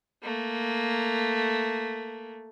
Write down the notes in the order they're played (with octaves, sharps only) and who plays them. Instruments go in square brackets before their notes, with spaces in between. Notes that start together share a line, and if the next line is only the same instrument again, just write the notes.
[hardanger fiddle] A3 A#3